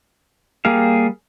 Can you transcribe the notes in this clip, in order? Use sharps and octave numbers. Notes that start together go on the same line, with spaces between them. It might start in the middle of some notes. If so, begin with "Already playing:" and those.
G3 A#3 G#4 F5